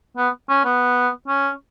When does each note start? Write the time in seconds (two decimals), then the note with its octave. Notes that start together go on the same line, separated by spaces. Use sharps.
0.17 B3
0.49 C#4
0.65 B3
1.28 C#4